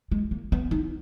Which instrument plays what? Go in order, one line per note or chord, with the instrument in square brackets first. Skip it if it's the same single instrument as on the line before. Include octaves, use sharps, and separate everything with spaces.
[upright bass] G#3
A#3
B3
D#4